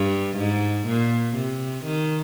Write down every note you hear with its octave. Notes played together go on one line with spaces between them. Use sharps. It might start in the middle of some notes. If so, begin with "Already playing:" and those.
Already playing: G2
G#2
A#2
C3
D#3